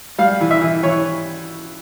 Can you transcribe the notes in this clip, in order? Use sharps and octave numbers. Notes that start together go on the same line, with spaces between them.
G3 F5
E3
E5
E3
E3 C#5